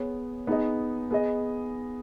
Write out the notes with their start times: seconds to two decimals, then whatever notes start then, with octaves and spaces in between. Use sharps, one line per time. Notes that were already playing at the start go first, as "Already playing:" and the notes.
Already playing: B3 G#4 C#5
0.47 B3 D#4 G#4 D#5
1.11 B3 G#4 D#5